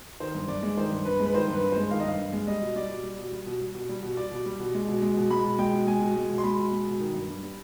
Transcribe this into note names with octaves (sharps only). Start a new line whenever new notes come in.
D#3 C5
G2
G2 D5
G#3
D#3 C5
G2
G2 B4
G#3
B4
D#3 C5
G2
B4
G2
G#3 C5
D#3 F5
D#5
G2 F5
G2
G#3
G3 D#5
B2
G3 D5
B2
G3
B2
G3
B2
G3
B2
G3
B2
G3 D5
B2
G3
B2
G#3
B2
G#3
B2
G#3 B5
B2
G#3 G5
B2
G#3 G#5
B2
G#3
B2
C6
G#3 B5
B2
G#3
B2
D#3
G2
G2
G3